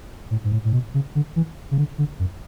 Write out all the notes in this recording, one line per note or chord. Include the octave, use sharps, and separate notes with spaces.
A2
G#2
A2
A2
B2
C#3
D3
E3
C#3
D3
D3
F#2